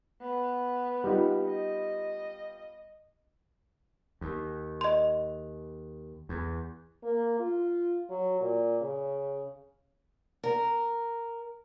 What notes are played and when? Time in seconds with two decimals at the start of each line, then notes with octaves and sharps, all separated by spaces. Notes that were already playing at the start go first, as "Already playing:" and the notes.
0.21 B3
1.04 G3 D#4 F4
1.47 D#5
4.21 D#2
4.81 D#5 C6
6.29 E2
7.04 A#3
7.40 F4
8.10 F#3
8.41 A#2
8.81 C#3
10.43 A#4